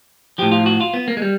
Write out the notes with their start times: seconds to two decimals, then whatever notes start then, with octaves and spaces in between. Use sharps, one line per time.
0.38 A2 F3 G4
0.52 F4
0.66 F#4
0.81 F4
0.94 B3
1.08 A#3
1.17 G#3
1.22 G3